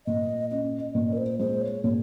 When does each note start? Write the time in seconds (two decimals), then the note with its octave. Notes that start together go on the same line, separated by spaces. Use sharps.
0.06 A#2 D#5
0.50 C#4 D#5
0.95 A#2 D#5
1.13 A#4
1.17 C5
1.39 G#3 C5
1.61 C#5
1.84 A#2 C#5